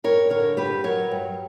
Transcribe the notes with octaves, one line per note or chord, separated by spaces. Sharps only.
G2 A#4 C#5
D3 A#4 C#5
G2 G4 B4
F#3 A#4 C#5
G2